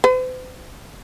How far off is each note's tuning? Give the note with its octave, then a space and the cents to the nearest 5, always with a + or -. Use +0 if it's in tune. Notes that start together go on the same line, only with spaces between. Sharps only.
C5 -45